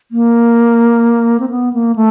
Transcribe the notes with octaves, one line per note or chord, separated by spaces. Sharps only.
A#3
C4
B3
A#3
A3